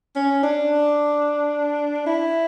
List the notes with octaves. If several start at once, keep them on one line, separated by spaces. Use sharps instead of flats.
C#4
D4
E4